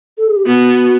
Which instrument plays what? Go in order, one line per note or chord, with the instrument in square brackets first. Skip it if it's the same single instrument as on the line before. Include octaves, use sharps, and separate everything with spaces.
[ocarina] A4
G#4
G4
[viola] B3 [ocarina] F#4